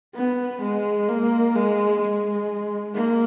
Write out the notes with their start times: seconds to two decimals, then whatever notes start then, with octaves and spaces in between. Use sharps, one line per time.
0.15 B3
0.62 G#3
1.08 A#3
1.55 G#3
2.01 G#3
2.94 A#3